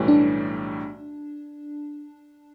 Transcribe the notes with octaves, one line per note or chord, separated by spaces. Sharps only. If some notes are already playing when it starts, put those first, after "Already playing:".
Already playing: B1 A2 E3 G3 C#4
D4